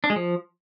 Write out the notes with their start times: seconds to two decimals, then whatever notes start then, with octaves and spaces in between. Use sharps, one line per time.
0.04 D4
0.10 G#3
0.16 F3